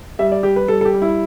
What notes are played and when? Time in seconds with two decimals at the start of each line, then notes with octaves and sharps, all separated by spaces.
0.19 G3 E5
0.32 D5
0.43 G3 G4
0.56 B4
0.68 G3 A4
0.81 A4
0.85 G4
0.94 G3
1.02 E4